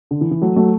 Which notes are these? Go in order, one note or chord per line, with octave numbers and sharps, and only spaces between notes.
D3
E3
E3
F#3 A3
F#3 A3